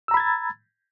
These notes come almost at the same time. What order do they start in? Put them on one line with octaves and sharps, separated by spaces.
E6 A#5 B5 G#6 A6